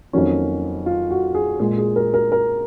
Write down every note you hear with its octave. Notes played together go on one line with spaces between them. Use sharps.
F2 D#3 F#3 A#3 C#4
F4
F#4
G#4
A#2 G#3 G#4
G#4
A#4
A#4
A#4